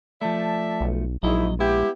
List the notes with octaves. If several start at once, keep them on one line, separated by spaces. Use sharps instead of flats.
F3 A3 D5 E5 A5
B1
A#1 G#2 F#3 E4 D#5
G#3 B3 E4 G4